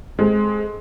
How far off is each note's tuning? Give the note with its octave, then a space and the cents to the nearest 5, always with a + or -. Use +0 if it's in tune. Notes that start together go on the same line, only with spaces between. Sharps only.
G#3 +20 C4 +0 A4 +0